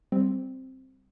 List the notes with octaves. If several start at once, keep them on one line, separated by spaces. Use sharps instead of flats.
G3 C4